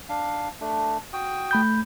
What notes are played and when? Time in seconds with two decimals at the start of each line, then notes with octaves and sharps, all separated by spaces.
0.09 D4 F5
0.61 A3 D4
1.13 F#4 G5 D#6
1.51 A3 B5 G6